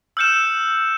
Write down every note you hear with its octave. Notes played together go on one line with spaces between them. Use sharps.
E6 F6 G6 C#7 E7